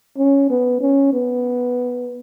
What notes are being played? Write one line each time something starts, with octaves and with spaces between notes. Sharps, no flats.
C#4
B3
C#4
B3